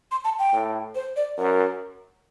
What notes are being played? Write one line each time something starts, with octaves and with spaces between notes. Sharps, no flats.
C6
A5
G5
A2
C5
D5
F#2 A#4